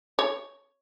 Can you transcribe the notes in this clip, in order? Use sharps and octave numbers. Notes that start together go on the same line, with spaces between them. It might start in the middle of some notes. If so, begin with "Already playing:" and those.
C#5